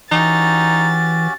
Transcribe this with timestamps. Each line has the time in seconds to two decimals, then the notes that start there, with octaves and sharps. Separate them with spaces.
0.11 E3 C#4 D#4 F#4 G4 A6